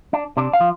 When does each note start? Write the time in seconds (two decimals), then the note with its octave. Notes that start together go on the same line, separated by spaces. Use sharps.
0.13 D4
0.37 C3 D4
0.53 F5
0.61 F3